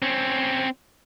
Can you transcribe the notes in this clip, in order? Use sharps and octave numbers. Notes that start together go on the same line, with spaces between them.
C4 C#4